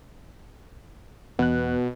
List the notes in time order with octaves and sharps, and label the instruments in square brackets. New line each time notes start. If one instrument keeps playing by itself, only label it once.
[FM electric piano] E2 F#6 [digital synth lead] B2